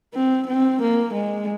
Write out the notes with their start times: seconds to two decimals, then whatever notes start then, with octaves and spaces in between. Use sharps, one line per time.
0.15 C4
0.48 C4
0.82 A#3
1.14 G#3